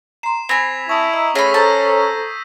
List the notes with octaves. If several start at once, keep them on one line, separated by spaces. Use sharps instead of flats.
A#5 C6 C7 E7
C4 G#5 B5 G#6 B6 F7
E4 A5 C#6 D#6
D#5 A#5 E6
A3 C#4 G#4 B5 A#6 C7 D#7
A4 C5 A5 A#5 E6 G6 B6